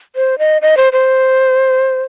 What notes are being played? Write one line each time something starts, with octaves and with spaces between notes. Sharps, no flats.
C5
D#5
D#5
C5
C5